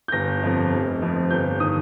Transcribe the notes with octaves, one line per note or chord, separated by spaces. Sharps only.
G6
G1 A#6
F2 F3
F1
F2 F3
G1 G6
D#3 D#6